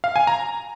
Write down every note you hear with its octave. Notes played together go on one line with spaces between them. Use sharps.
F5
G#5
A#5